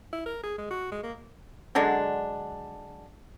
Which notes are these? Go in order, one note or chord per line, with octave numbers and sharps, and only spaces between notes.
E4
A#4
G#4
G#3
F#4
G#3
A#3
D3 F#3 G#3 D4